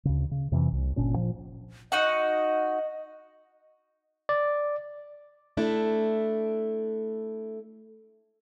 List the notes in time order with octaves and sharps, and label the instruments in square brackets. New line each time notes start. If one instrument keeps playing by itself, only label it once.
[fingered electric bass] D2 C#3
C#3
F2 C3 D#3 E3
C2
G1 A#2 C#4 D4
A#2 F3
[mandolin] D#4 F#4 F#5 [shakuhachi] D#5
[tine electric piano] D5
[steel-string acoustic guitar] A3 D4 E4